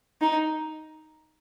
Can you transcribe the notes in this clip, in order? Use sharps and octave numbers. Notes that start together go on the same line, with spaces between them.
D#4